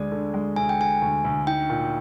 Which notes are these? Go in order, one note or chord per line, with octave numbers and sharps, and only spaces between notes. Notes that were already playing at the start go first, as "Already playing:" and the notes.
Already playing: D2 G#3 D5
D3
G#3
D2 G#5
G5
D3 G#5
D2
D2
D#4 G5
A#2